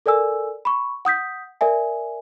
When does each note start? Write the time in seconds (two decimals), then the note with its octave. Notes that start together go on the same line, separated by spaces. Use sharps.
0.06 A4 A#4 D5 G#5 E6
0.65 B5 C#6
1.05 F#5 D#6 G6 B6
1.61 A#4 D5 E5 G#5